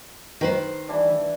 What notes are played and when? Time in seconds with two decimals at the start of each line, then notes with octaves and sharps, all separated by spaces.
0.41 D#3 B4 C5
0.88 E3 G3 D4